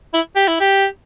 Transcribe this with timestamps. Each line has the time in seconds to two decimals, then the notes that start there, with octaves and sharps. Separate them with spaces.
0.14 E4
0.36 G4
0.48 E4
0.60 G4